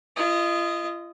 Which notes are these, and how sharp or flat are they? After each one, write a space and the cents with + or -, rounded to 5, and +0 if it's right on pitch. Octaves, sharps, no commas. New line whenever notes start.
F4 -40 D#5 +0